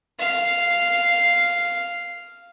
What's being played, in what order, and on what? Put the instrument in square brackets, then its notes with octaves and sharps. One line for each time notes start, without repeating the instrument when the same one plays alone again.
[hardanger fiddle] F5